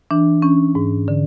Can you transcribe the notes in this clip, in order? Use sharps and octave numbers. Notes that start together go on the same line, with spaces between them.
E3 D4
E3 C#4
G#2
D3